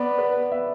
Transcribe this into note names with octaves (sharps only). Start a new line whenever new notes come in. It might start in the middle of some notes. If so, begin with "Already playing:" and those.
Already playing: B3 D5
B4
E5